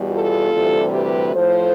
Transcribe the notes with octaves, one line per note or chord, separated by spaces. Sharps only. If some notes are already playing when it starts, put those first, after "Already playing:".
Already playing: E2 B2 G3
F4 A4
D2 C3 E3 G3
G4 B4
A2 F3 A4 C5